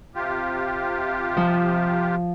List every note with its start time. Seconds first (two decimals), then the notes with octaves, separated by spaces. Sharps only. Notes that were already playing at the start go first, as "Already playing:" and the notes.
0.15 C3 F4 G4
1.37 F3